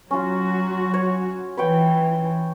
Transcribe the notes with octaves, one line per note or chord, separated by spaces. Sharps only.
F#3 C#4 F4 F#4
C#5
E3 B4 C#5 G5